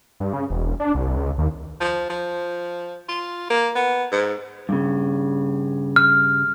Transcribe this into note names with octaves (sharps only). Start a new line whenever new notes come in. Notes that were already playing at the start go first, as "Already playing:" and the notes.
G2
C#3
E1
D4
C2
C#2
D#2
F3
F3
F4
A#3
B3
G#2
G2 C#3
F6